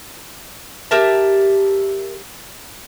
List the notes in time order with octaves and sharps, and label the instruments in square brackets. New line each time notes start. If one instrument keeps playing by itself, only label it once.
[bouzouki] G4 A#4 E5 A5